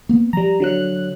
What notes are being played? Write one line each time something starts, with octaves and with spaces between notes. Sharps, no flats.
A#3 B3
F3 G3 A#5
D3 F#3 F#6